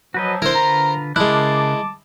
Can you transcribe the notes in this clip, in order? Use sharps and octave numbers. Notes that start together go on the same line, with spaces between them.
F3 F#3 F#4 B4 D#5
D3 E4 A#4 C5
D3 F4 B4 A#5
C#3 G#3 E4 A#4 A5 D6 F#6